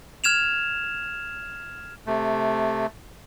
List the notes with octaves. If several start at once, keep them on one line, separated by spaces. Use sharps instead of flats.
F6 G#6 E7 F7
C3 A3